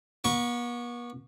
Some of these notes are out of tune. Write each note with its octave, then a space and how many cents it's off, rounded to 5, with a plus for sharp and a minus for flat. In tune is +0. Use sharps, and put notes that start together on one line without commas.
B3 -45 C#6 +0